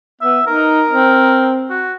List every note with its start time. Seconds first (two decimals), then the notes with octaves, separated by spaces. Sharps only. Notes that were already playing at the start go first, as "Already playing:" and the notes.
0.21 B3 E5
0.47 D#4 A#4
0.89 C4
1.70 F#4